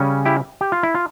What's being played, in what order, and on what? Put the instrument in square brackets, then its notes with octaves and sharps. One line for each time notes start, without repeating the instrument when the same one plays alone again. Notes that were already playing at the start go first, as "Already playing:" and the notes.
Already playing: [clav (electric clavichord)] C#3 G3 C#4
E4 G4
G4
F4
E4
F4